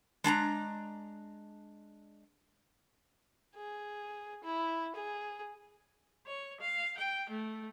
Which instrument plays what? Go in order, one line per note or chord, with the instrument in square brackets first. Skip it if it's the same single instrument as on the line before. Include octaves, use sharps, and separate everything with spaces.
[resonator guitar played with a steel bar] G#3 D4 A5 A#5
[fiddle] G#4
E4
G#4
[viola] C#5
F5
G5
A3